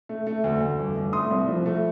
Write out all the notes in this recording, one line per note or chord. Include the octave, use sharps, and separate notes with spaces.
A3
A3
D2
D2
G1
G1
A3 C6 D#6
C2
F3
A3